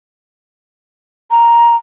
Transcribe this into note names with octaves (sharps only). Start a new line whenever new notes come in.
A#5